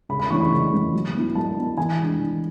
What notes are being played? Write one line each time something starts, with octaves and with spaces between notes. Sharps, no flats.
C#3 B5
B5
E3 A3 C#4 C#6
B5
C#3
E3 A3 C#4
F#3
B3 E4
F#3 A5
B3 E4
E3 G#5
G#3 D4
E3